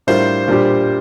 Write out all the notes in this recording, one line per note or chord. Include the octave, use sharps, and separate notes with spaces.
A2 G3 D4 F4 A#4 C5
A#2 G3 D4 G4